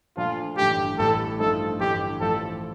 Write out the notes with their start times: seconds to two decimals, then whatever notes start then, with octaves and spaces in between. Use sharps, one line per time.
0.17 A#2 F3 A3 D4 F4
0.57 A1 G2 D3 A3 G4
0.98 A1 A2 G3 A4
1.39 G2 F3 A3 D#4 A4
1.80 A1 G2 D3 G4
2.21 A1 A2 F3 A4